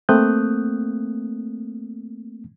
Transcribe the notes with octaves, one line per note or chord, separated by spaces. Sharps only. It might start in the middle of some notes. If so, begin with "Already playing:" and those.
A3 A#3 C4 D#6 F#6 G6